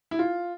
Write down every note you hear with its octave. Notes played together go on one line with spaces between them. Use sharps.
E4
F4